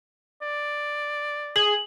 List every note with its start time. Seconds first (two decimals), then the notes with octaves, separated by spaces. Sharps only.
0.42 D5
1.56 G#4 F#7